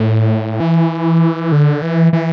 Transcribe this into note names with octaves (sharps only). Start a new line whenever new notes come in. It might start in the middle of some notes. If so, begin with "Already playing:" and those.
Already playing: A2
E3
D3
E3
E3